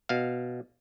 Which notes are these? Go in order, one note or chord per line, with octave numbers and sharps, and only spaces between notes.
B2 F5